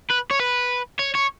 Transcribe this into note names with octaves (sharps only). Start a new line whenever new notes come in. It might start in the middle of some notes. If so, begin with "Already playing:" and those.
B4
C#5
B4
C#5
C#5